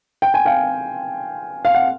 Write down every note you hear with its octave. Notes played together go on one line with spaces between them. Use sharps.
G5
G#5
F5 G5
F5
F#5